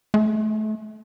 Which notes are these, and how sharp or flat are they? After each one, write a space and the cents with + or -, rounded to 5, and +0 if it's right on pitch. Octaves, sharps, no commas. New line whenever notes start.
A3 -30